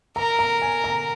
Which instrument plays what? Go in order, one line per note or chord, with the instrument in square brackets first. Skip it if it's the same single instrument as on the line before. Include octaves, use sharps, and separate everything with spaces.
[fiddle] A#4 [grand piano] A#5
[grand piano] A#5
G#5
A#5